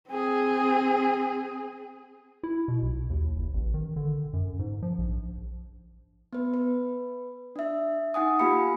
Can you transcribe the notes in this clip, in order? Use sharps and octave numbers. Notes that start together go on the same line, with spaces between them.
C4 G#4
E4
B2
B1
D#2
F#1
A1
D#3
D3
F#2
G#2
F3
A#1
B3 B4
B4
D4 E5
D#4 F#5 G#5 D#6
A#3 F4 G4 F5 B5 C#7